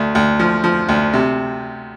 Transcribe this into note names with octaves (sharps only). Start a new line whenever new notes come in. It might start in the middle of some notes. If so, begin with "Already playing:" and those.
Already playing: D2 A3
D2
F3
F3
D2
C3